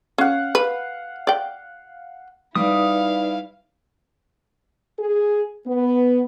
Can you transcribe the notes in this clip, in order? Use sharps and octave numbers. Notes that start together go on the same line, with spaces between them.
C#4 F5 F#5
B4
D5 G5
G3 D#4 E4 B4 D5 F5 D#6
G#4
B3